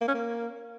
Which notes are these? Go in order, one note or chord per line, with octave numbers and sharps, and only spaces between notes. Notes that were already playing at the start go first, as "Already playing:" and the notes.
A#3
C#4
A#3